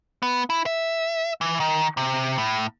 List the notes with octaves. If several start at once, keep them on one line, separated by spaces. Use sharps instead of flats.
B3
E4
E5
E3
D#3
C3
A2